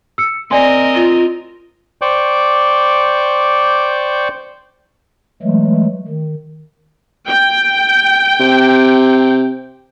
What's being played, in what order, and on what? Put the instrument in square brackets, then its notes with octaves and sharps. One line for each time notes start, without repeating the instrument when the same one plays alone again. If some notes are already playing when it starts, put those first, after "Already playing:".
[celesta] E6 C#7
[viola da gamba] C4 A#4 D#5 [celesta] D5 G#5 C6
[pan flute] F4
[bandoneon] C5 D5 G5 C#6 D6 G6
[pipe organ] E3 F#3 G#3 A3
D#3
[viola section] G5
[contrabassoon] C3